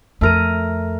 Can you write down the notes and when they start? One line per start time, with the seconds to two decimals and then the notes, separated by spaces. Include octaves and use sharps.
0.21 F2 A3 A#4 D#7